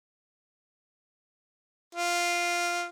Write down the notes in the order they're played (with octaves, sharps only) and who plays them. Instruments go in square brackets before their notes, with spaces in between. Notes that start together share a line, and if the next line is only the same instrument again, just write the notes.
[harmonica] F4